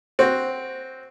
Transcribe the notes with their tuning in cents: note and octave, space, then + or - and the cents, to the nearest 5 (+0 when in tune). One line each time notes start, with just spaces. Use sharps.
C4 +0 F#4 +0